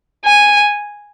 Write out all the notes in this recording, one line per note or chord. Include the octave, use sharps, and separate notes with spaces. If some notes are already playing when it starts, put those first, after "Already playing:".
G#5